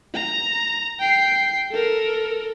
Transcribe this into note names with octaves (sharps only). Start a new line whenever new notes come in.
A#5
G5 C7
A4 A#4